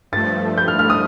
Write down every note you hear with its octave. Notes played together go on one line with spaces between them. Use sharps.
G2 F3 A3 A6
G6
F6
F6
D#6